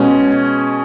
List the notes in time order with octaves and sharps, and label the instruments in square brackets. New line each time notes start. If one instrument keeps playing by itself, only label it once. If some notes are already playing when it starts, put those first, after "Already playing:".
Already playing: [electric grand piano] B2 G#3 C#4